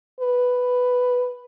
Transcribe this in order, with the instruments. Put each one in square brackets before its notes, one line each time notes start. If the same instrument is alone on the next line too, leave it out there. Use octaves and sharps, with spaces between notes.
[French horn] B4